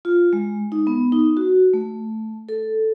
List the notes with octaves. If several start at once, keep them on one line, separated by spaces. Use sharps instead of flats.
F4
G#3
D#4
B3
D#4
F#4
A3
A4